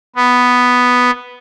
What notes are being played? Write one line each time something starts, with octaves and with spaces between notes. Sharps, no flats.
B3